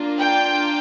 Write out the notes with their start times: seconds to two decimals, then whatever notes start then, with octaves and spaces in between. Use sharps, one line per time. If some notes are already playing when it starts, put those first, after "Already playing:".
Already playing: A#3 D4 F4
0.19 G5